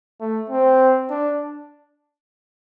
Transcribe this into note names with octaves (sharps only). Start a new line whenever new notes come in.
A3
C4
D4